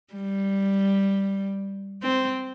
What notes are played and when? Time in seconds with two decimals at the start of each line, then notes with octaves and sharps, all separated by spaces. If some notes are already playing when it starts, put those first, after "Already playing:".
0.14 G3
2.02 C4